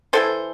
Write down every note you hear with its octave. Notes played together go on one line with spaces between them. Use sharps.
E3 B3 E4 A4 C5